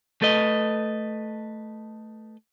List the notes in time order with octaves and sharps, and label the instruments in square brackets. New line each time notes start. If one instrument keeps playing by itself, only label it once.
[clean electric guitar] A3 A4 B4 D#5